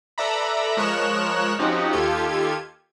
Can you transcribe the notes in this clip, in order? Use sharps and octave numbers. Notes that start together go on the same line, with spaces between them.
A4 B4 D5 E5 A#5 B5
F3 G#3 A#4 C#5 F#6 E7
F3 C4 C#4 D#4 F#4 G4
D#2 F4 G4 A4 G#6